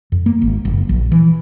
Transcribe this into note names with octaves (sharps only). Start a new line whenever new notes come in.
F2
A#3
G#1
F#1
A#1
E3